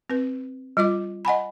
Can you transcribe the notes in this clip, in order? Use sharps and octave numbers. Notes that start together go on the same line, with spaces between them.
C4 B4
G3 F4 D#5 D6
D#5 F#5 G#5 B5